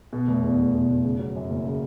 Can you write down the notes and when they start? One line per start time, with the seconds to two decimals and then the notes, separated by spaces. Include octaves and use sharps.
0.13 B2
0.27 F1
0.43 E2
0.58 F1
0.74 B2
0.89 F1
1.04 C#3
1.19 F#3
1.35 F#2
1.50 F#1
1.65 C#3